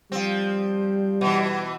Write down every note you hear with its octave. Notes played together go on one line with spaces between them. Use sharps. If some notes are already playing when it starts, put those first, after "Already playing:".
F3 G3 C4
B2 E3